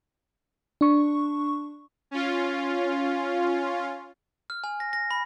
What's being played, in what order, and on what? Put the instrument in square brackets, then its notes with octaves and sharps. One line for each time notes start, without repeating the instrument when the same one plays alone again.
[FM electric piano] D4 C#6
[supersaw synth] C#4 F4
[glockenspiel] F6
G#5
A#6
A#6
B5